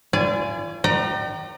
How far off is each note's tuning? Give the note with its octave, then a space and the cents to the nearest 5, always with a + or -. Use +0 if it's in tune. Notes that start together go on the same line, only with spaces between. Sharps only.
F4 -45 D5 -15 G#5 +0
D5 +40 G5 -30 A#5 +10